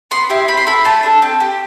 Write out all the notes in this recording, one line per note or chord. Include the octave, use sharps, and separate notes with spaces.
B3 C6
E4 G4
C4 B5
C6
E4 A4 B5
A3 A5
D4 A4
C4
G4